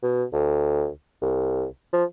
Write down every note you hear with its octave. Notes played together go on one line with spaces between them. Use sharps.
B2
D2
C2
F3